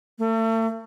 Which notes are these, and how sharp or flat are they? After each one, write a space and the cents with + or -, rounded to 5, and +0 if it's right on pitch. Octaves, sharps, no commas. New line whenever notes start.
A3 +35